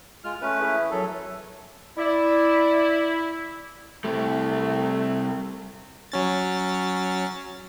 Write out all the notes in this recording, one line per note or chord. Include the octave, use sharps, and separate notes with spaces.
G#3 F4 F6
A3 C#4 B4
E3 E4 G#4
F#2 F#3 A4
E4 D5
C3 G3 A3
F#3 C#4 A6